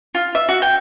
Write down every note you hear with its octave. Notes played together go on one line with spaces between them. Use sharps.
F4
E5
F#4
G5